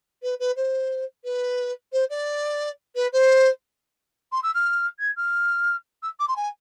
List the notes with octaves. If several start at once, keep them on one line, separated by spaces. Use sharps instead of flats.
B4
B4
C5
B4
C5
D5
B4
C5
C6
E6
F6
G#6
F6
E6
D6
C6
G#5